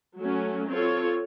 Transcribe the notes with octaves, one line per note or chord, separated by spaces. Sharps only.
F#3 A3 C#4
C4 F4 A4 C#5